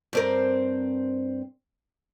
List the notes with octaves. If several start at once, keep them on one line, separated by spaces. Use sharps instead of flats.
G2 C4 A#4